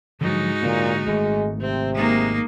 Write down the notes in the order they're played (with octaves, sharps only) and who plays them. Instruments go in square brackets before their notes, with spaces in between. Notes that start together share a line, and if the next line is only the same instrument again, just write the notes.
[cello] G#2 [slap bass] D3 F3 F#3 [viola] D#4 F#4
[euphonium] A#2 [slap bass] D3 A#3
[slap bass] G#1 A3 [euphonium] G#3
[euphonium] C3 [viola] C4
[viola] G#3 [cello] A#3 D#4